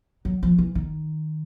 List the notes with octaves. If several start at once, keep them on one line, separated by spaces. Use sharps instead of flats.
F#3
F3
E3
D#3